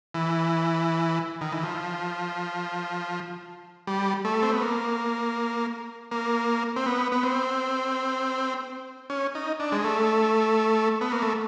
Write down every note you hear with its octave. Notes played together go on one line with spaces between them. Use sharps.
E3
D#3
E3
F3
G3
A3
C4
B3
A#3
A#3
C4
B3
B3
C4
C#4
D#4
D4
G#3
A3
B3
A#3
A3